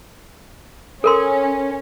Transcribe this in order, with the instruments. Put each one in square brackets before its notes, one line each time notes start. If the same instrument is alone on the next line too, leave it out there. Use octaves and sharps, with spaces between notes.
[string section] C#4 [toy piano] A4 A#4 C6